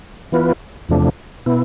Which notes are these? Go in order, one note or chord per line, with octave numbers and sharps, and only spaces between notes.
E3 B3 F4 B4
E2 C3 F3 A3 D4
B2 B3 E4